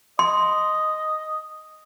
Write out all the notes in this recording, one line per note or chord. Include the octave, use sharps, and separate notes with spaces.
D#5 C6